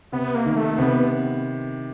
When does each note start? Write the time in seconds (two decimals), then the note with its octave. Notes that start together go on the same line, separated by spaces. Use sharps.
0.12 C3 B3
0.35 A#3
0.46 D#3
0.56 A3
0.78 C3 B3